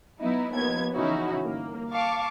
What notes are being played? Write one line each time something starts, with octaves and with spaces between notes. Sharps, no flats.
F#3 B3 D#4 E4
D#2 F3 B3 G#6
C#3 E3 C#4 D#4 E4 F#4
G1 A#3
F5 A5 C#6 D6